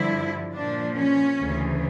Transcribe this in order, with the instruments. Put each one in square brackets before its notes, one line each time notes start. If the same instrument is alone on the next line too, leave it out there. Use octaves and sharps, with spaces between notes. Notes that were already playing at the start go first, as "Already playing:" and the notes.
Already playing: [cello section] G2 D3 F3 E4
A#2 F3 D4
C#4
D2 C#3 E3